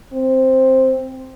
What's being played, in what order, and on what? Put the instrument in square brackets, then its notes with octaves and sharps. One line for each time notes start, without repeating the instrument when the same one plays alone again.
[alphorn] C4